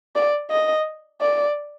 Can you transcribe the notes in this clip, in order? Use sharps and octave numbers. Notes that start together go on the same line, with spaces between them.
D5
D#5
D5